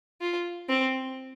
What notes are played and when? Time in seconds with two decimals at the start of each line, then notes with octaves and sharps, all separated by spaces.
0.21 F4
0.69 C4